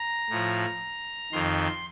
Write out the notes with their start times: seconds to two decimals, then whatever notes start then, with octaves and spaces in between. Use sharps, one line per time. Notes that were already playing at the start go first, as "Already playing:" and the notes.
Already playing: A#5
0.30 A2 F3
1.32 F2 D#3 C6